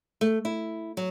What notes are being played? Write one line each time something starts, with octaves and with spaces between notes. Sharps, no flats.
A3
E4
F#3